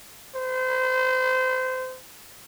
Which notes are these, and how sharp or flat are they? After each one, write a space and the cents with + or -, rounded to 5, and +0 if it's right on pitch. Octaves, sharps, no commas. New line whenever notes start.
C5 -25